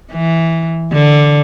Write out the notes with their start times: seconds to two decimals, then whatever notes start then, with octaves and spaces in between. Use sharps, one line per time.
0.12 E3
0.93 D3